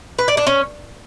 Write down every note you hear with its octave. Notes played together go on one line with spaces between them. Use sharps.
B4
D5
D4
C#4